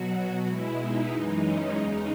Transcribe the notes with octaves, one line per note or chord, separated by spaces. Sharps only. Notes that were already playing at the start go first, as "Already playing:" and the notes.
Already playing: B2 F#3 F#4
B2 G#3 E4
D#4
F#2 E3 G#3
C#4
E2 C#3 G#3 D#4